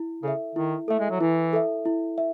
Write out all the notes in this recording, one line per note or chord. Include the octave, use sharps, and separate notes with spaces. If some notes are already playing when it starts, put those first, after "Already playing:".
Already playing: E4
C#3 A4 E5
D#3 E4
A3 A4 E5
G#3
F#3
E3 E4
A4 E5
E4
E5